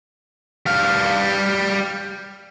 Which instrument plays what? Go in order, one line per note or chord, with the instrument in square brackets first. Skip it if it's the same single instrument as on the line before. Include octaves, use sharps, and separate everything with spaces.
[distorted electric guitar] G3 F5